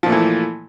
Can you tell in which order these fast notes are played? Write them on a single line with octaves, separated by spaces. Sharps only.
F3 A#2 A3 E3